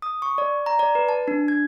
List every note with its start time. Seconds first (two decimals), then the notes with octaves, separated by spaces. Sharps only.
0.02 D#6
0.22 C#6
0.38 D5
0.66 A#5
0.79 D5
0.95 B4
1.09 A5
1.28 D4
1.48 G#6